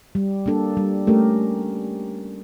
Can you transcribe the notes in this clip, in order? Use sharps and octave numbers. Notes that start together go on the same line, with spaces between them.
G3
A#3 D4 A4
G3
A3 C#4 G4 A#4